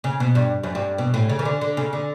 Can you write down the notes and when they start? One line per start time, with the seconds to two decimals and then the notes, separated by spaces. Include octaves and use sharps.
0.04 C#3
0.20 B2
0.35 G2
0.63 F#2
0.75 G2
0.98 B2
1.14 A2
1.29 C#3
1.39 E3
1.45 D3
1.61 D3
1.77 C#3
1.93 D3